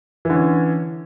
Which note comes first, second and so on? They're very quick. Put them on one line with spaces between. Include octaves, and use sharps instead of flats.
E3 D3 C#4